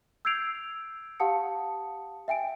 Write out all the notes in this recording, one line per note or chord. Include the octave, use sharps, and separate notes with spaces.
E6 G6 G#6 C7 D7 F7
G4 F5 F#5 A5 D#6 C#7
E5 G5 G#5 D7